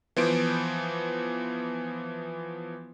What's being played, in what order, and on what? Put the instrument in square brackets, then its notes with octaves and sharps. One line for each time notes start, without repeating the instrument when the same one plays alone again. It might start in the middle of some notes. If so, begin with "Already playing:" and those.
[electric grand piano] E3 F3 B3 C5 D7